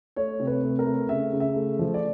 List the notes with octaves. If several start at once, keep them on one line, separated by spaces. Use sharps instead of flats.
A3 C#5
C3
B4
A3
A#4
A3
C#3 E5
C#3
E5
A3
F3
D5